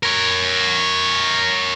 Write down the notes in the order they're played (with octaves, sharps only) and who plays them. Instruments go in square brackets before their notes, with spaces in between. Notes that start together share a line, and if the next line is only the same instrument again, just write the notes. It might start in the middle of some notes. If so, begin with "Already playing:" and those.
[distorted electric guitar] A#4 C#5